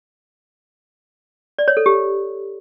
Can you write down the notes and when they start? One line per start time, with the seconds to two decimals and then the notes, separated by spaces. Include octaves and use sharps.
1.59 D5
1.68 C#5
1.77 A4
1.86 G4